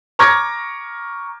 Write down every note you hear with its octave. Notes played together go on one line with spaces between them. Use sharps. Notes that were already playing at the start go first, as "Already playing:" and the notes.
A#5 C#6 D6 F6 G#6 A#6